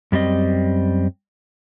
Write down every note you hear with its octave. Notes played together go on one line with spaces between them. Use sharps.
F#2 G3 C4 D#5